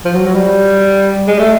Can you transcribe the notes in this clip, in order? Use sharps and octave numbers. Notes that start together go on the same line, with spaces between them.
F3
F#3
F#3
G3
G#3
A3